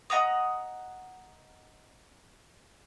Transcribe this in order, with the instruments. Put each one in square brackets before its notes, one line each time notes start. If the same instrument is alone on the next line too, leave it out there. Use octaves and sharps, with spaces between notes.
[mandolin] D#5 F#5 A#5 D#6